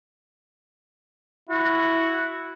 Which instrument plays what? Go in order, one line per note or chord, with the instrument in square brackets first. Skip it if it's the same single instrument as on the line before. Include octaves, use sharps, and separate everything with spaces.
[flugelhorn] E4 [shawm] F#4